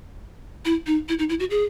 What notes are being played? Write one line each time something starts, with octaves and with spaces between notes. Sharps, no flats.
E4
D#4
E4
D#4
E4
F#4
G#4